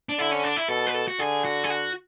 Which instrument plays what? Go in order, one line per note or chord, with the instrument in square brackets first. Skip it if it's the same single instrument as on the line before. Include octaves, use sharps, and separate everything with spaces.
[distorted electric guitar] D4
[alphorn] D3 [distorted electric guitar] E4
[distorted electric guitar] C#4
D4
E4
[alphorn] B2 [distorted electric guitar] A4
[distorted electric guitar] B4
A4
F#4
[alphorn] D3 [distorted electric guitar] G#4
[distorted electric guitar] F#4
G#4
F#4